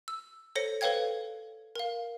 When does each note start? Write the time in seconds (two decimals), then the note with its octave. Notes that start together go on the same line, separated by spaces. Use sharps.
0.08 E6
0.55 A4 C5 C#5 A#6 C#7
0.81 A4 B4 C#5 F5 G5 G#6
1.76 A#4 F5